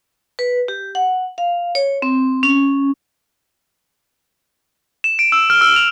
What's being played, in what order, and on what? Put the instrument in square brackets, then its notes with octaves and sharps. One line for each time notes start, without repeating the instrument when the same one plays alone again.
[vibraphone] B4
G4
F#5
F5
C#5
C4
C#4
[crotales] E7
D7
E6
F6
E6
F7